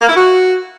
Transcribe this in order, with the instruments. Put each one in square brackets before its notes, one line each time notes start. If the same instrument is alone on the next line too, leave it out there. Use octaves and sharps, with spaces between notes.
[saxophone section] A#3
E4
F#4